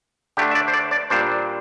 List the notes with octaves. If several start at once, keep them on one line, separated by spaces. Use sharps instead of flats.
D3 A3 D4 G4
E5
D5
C5
D5
D5
A#2 G3 D4 C5